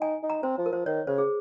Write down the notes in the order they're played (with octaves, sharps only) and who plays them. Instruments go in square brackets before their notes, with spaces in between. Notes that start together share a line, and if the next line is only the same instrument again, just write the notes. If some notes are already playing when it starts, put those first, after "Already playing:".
[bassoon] D#4 [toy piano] G#5
[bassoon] D#4
[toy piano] A#5
[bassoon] C4 [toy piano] C5
[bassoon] F3
[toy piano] A#4
[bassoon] F3 [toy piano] C5
[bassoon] D#3 [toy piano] C#5
[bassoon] C#3 [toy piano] C5
[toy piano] G#4